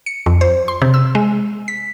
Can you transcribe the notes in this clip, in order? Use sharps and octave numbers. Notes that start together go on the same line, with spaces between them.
C#7
F2
C5
C6
C3
E6
G#3
B6